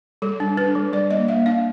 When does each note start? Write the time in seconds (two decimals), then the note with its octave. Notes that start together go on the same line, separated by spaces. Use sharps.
0.22 G3 A4
0.40 D4
0.57 D4 B4
0.75 G3
0.93 G3 D5
1.11 A#3 D#5
1.28 A#3 E5
1.46 D4 F5